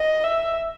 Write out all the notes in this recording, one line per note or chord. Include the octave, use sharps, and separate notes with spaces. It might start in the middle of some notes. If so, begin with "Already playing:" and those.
Already playing: D#5
E5